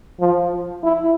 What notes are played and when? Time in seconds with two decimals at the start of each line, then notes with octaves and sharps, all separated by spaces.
0.20 F3
0.83 E4